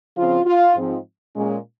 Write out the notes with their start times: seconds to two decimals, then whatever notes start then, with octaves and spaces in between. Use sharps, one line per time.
0.16 C#3 F3 C4 F4
0.46 F4
0.76 G#2 F3 C4
1.35 A#2 G#3 C#4